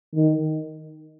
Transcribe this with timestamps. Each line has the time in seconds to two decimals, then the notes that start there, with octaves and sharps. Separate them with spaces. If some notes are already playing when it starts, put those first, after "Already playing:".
0.15 D#3